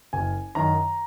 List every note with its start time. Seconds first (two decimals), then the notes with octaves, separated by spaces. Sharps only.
0.13 F#1 G#5
0.55 F#2 D#3 A#5